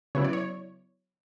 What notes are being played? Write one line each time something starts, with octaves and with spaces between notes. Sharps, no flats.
C#3 F#3 B3 E4 C#5
D5
C#5